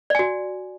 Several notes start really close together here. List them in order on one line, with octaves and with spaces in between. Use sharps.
D5 G#5 F#4